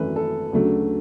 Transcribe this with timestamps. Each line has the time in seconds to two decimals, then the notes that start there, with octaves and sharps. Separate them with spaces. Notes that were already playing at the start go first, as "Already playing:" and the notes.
Already playing: G#1 F#2 E3 A3 B4
0.16 A4
0.52 D2 C#3 F#3 A3 D4